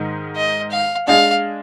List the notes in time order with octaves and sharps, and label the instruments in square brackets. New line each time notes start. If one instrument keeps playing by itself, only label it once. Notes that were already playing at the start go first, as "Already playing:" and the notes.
Already playing: [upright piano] G#2 D#3 G#3 D#4 A#4
[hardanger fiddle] D#5
F5
[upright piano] G#3 D4 G#4 [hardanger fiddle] F5